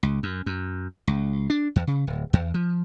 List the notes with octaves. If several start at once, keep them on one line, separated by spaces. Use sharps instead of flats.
C#2
F#2
F#2
C#2
D4
E2
C#3
D1
E2
F3